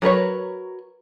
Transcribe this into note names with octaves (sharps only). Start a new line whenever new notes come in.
F#3 A#4 B4 C#5